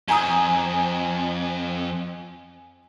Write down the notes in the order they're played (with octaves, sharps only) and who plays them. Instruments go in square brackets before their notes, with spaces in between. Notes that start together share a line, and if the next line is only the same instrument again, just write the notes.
[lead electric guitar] F2 [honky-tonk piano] G#5 A#5 D#6